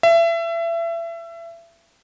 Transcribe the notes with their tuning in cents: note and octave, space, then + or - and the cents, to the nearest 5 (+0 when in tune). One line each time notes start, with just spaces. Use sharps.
E5 +30